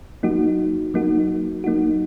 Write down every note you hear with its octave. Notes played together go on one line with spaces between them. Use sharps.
F#3 A#3 D#4 F#4
F#3 A#3 D#4 F#4
F#3 A#3 D#4 F#4